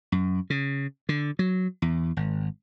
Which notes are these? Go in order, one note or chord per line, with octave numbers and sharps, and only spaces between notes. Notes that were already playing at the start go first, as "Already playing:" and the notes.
F#2
C#3
D3
F#3
E2
G#1